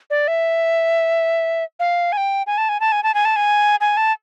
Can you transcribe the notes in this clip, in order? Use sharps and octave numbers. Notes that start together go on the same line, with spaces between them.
D5
E5
F5
G#5
G5
G#5
A5
G#5
A5
G#5
A5
G#5
A5
G#5
G#5
A5